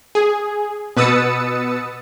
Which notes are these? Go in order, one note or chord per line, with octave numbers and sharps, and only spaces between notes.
G#4
B2 B4 D#6 E6 A6 C#7